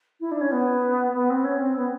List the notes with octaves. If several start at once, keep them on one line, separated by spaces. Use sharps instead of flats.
E4
D4
C#4
B3
B3
C4
C#4
C4
B3